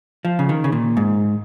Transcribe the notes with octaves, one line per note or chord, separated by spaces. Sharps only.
F3
C#3
D#3
C#3
A#2
G#2